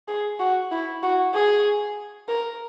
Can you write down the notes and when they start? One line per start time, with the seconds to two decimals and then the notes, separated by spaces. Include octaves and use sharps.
0.08 G#4
0.39 F#4
0.71 E4
1.03 F#4
1.34 G#4
2.28 A#4